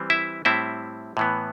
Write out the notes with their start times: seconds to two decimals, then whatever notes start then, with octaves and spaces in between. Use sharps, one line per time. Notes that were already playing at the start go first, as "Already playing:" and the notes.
Already playing: E3 G3 C4
0.10 E4 E5
0.45 A2 G3 C4 E4 E5
1.17 A2 E3 B3